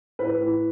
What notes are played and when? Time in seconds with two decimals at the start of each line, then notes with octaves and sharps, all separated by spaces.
0.19 A2 B4
0.40 A2